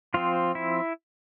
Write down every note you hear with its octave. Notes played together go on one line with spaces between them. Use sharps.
F3 C4 F4
E4